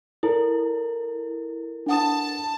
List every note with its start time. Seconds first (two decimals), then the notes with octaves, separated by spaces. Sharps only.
0.23 E4 A4 A#4
1.86 D4 F#5 A5 D#6